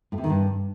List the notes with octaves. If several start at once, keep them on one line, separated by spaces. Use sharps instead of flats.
A2
C3
D#3
G2